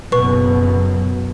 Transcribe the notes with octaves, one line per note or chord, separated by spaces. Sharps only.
F#1 B2 F#3 B4 C#6